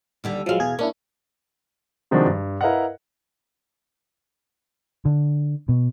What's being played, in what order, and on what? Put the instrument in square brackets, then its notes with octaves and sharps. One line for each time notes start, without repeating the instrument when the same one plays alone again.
[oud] D#2 D3 G3
[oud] E2 F5 [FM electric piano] F3 F#3 G#3
[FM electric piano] B2 G#4 G#6
[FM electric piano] A#3 D4 E4 [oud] C#4
[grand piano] C3 D#3 F3 G#3 D4 F#4
G2
E4 A#4 B4 D#5 F5 F#5
[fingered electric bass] D3
B2